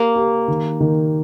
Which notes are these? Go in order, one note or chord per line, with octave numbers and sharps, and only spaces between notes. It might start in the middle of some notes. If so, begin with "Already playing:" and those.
Already playing: A#3 G4
G4
D#3
D#3